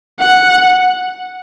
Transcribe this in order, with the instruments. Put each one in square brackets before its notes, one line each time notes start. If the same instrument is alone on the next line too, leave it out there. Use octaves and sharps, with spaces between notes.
[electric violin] F#5